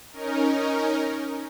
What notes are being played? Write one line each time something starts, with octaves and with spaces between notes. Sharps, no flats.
C#4 D#4 A#4